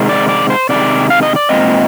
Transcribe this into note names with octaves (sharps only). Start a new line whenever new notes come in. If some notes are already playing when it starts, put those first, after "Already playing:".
Already playing: C3 D#3 G#3
D5
D5
C5
C3 D#3 G#3 D5
F5
D#5
D5
A#2 G#3 C4 D#5